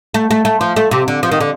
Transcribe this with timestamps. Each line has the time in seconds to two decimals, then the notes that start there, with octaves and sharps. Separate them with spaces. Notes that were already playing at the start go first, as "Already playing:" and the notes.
0.14 A3
0.31 A3
0.45 A3
0.61 F3
0.76 A3
0.91 C3
1.08 D3
1.23 F3
1.31 D#3
1.41 D3